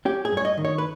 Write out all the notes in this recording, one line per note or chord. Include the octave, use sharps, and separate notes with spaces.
C#4 G4
G#4
G2 C#5
D#5
D#3
C#5
B4